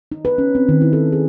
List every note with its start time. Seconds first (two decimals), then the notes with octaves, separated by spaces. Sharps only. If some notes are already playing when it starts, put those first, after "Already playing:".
0.12 D#4
0.25 B4
0.38 C#4
0.55 C4
0.69 D#3
0.81 E4
0.93 A4
1.12 G#4